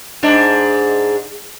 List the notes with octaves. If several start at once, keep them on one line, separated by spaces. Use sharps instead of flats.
G#2 D4